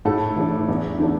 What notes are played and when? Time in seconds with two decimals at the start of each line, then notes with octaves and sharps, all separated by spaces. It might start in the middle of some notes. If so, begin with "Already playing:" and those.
0.05 A2 A4
0.36 E3 A3 D4
0.68 E2
0.99 D3 A3 D4